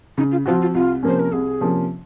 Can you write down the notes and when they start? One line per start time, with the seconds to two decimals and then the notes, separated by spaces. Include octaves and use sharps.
0.18 C#3 D#4
0.31 F4
0.46 F3 C4 F4 F#4
0.61 F4
0.74 C2 F4
1.03 C3 F3 A#3 C#4 C5
1.19 A#4
1.32 C2 G#4
1.61 C3 F3 A#3 C#4